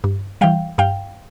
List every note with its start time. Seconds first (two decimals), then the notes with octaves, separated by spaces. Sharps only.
0.04 G2
0.41 E3 G3 F5 G5
0.78 G2 F5 G5